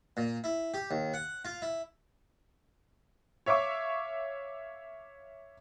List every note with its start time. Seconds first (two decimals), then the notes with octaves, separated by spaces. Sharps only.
0.17 A#2
0.44 E4
0.74 G4
0.91 D#2
1.14 F#5
1.45 F4
1.62 E4
3.46 C#5 E5 F5 C#6 D6 E6